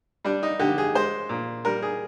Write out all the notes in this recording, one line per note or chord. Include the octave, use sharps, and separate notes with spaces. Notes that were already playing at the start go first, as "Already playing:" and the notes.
G3 D4
D#4
D3 G4
G#4
G#3 C5
A#2
G3 A#4
G#4